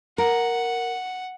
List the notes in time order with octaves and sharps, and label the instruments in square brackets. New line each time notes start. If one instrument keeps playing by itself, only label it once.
[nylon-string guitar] A#4 [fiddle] F#5